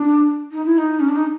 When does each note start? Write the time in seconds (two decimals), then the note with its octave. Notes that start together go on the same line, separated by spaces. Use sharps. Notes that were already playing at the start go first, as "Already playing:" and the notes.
Already playing: D4
0.52 D#4
0.65 E4
0.78 D#4
1.00 C#4
1.09 D4
1.16 D#4